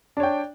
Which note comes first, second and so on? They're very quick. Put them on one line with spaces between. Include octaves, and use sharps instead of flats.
D4 C#5 G5